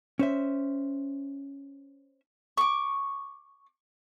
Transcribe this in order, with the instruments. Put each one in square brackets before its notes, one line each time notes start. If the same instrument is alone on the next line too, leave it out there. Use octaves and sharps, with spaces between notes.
[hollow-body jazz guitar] C#4 C5 E5
[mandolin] C#6 D6